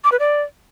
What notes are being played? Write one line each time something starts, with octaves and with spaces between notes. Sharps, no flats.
D6
B4
D5